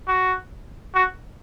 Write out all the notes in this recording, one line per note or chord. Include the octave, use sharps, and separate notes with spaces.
F#4
F#4